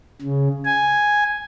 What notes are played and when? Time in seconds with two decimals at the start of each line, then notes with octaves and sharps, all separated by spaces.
0.22 C#3
0.65 G#5